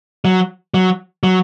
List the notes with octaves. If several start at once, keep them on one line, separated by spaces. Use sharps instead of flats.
F#3
F#3
F#3